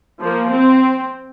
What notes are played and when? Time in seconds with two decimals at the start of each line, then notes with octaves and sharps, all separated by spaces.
0.19 F3 A#3
0.51 C4